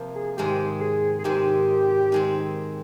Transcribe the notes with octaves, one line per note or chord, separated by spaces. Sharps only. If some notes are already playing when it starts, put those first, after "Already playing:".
Already playing: C3 F3 A#3
G#4
G#2 D#3 G#3 C4 G4
G#4
G#4
G#2 D#3 G#3 C4 G4
D#3 G#3 C4